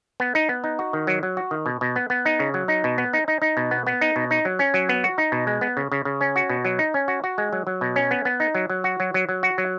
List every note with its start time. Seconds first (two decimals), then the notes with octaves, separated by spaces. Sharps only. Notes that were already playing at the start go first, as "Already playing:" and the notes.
0.20 B3
0.35 D#4
0.49 B3
0.64 D#4
0.79 F#4
0.93 D#3
1.07 F#3
1.23 F#3
1.37 F#4
1.51 D#3
1.66 B2
1.81 B2
1.96 B3
2.10 B3
2.25 D#4
2.40 C#3
2.54 F#3
2.68 D#4
2.84 B2
2.98 B3
3.13 D#4
3.28 D#4
3.42 D#4
3.57 B2
3.71 B3
3.87 B3
4.01 D#4
4.16 B2
4.31 D#4
4.45 F#3
4.59 C#4
4.74 F#3
4.89 B3
5.04 F#4
5.18 D#4
5.32 B2
5.47 G#3
5.61 B3
5.77 C#3
5.92 C#3
6.05 C#3
6.21 C#4
6.36 F#4
6.49 B2
6.65 F#3
6.79 D#4
6.94 C#4
7.08 F#4
7.24 F#4
7.38 G#3
7.53 F#3
7.67 F#3
7.81 B2
7.96 C#4
8.11 B3
8.25 B3
8.40 D#4
8.55 F#3
8.70 F#3
8.84 F#4
9.00 F#3
9.14 F#3
9.29 F#3
9.43 F#4
9.58 F#3